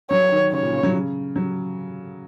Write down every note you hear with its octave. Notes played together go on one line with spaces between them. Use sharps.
F#3 C#5
D#3
C#3 C#5
A#2
C#3
F#3
C#3
F#3